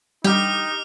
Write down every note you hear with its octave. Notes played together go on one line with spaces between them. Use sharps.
G3 D#4 G4 D6 F6